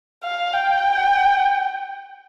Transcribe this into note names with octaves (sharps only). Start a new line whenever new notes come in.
F5
G5